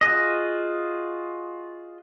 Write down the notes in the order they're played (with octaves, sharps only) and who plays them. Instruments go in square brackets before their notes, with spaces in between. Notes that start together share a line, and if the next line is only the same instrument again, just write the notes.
[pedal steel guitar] F4 F#4 G#4 D#5